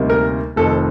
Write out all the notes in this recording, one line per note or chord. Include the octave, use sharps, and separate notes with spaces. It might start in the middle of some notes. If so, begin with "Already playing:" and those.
Already playing: D2 C3 G3 A#3 D#4
A#4
F1 F2 D#3 A4